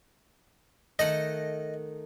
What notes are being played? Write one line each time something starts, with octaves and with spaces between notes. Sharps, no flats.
D#3 A3 D#5 F#5